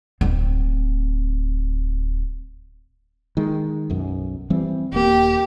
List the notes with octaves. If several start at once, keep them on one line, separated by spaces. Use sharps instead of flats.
D1 C4
D#3 G#3
B1 F#2
E3 G3 C4
D#1 A#3 G4